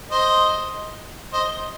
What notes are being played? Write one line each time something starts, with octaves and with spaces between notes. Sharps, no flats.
C5 D#5
C5 D#5